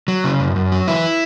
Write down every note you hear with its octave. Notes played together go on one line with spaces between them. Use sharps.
F#3
C#3
F#2
F#2
F#3
E3 E4